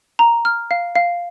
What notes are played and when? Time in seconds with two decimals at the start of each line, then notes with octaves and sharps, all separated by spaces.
0.19 A#5
0.45 F6
0.71 F5
0.95 F5